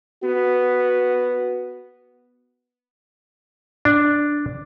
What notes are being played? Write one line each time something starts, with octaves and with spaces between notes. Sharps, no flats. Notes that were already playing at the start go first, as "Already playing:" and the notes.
B3 F#4
D4